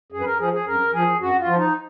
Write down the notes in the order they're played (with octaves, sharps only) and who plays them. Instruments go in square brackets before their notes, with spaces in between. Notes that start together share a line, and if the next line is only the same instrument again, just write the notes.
[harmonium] F#2 G#4
B4
A#4
F3 G#4
G#4
F#2 A#4
F3 G#4
F#2 F#4
F4
F3
D#4